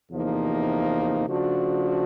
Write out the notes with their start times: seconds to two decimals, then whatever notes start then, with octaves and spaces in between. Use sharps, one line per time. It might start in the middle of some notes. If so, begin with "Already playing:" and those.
0.12 E2 C3 F3 A#3 D#4
1.28 C#3 F3 A3 D4 F#4